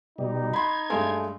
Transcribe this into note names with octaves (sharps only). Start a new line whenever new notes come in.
B2 G3 D#4
B5 C6 G#6
G2 G#3 A3